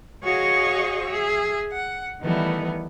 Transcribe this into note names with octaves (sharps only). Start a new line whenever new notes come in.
F#4 G#4 C#5 D#5 F5 C#6
G#4 E5
F#5
D#3 E3 G3 A3 B3